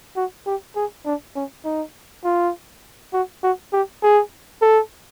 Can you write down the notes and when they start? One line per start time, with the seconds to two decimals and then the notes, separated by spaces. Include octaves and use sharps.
0.16 F#4
0.46 G4
0.76 G#4
1.06 D4
1.36 C#4
1.65 D#4
2.24 F4
3.13 F#4
3.43 F#4
3.73 G4
4.03 G#4
4.62 A4